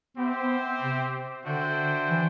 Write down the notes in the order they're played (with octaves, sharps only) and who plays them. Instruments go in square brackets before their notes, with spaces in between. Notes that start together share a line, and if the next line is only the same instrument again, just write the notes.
[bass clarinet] B3 [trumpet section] C4 G4 C5 E5
[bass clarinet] B3
C3
[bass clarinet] D3 [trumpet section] D4 F#4 C5 E5 G5
[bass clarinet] E3